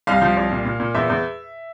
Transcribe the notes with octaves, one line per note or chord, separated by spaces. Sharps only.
C2 F5
F3
C2
A#2
A#2
A#2
E2 E5
E2